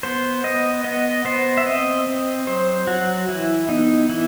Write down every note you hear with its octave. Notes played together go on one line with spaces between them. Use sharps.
B3 C5
B3 D#5
B3 D#5
B3 C5
E5
C4 D#5
C4
F#3 C5
F#3 F#4
E3 E4
B3 D#4
E3 E4